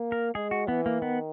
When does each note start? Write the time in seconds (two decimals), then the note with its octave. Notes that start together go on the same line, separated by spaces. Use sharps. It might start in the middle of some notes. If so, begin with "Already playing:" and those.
Already playing: A#3
0.12 A#4
0.35 G#3 G#4
0.51 F#4
0.68 E3 B3
0.86 A#3
1.02 D#3 B3